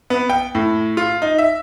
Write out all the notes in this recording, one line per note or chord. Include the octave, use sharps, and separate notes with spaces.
B3
G5
A2
F4
D#4
E5